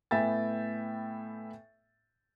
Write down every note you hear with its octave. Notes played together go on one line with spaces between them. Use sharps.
A2 B3 E5 G5 G#5 A6